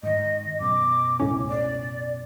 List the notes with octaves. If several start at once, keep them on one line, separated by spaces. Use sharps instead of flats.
G#2 D#3 D#5
F#2 B2 D6
C#2 A2 C#4
D5